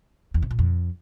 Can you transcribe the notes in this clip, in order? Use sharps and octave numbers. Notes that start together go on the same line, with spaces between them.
E2
C3
A#2
F2